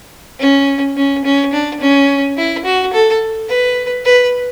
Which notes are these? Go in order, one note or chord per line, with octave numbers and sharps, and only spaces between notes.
C#4
C#4
C#4
D4
C#4
E4
F#4
A4
B4
B4